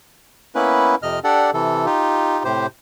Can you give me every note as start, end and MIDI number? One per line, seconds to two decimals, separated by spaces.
0.55 0.95 58
0.55 0.95 59
0.55 0.95 61
0.55 0.95 64
0.55 0.95 71
1.03 1.19 41
1.03 1.19 48
1.03 1.19 75
1.03 1.19 89
1.24 1.51 62
1.24 1.51 67
1.24 1.51 69
1.24 1.51 74
1.24 1.51 78
1.54 1.86 48
1.54 1.86 52
1.54 1.86 69
1.86 2.43 63
1.86 2.43 65
1.86 2.43 67
2.45 2.67 45
2.45 2.67 48
2.45 2.67 67
2.45 2.67 72